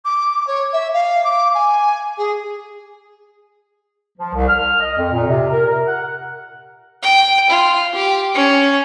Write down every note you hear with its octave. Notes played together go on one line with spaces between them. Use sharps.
D6
C#5
E5
F5
D6
G#5
G#4
F3
C2
F6
D#5
F2
A#2
C3
A#4
A#4
F#5
G5
F4
G4
C#4